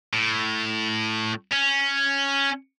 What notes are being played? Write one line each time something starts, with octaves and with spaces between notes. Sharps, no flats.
A2
C#4